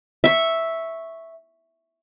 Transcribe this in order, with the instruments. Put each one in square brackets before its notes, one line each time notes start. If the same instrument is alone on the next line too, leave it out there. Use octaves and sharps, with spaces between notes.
[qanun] E5 C#6